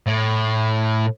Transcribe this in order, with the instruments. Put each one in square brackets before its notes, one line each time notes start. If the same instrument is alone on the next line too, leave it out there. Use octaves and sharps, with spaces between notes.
[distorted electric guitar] A2